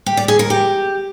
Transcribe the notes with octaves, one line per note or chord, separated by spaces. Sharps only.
G4
D5
G#4
A#4
G4